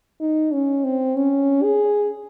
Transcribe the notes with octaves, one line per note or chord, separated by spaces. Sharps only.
D#4
C#4
C4
C#4
G#4